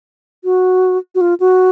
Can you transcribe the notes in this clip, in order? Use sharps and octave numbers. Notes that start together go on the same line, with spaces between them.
F#4
F#4
F4
F#4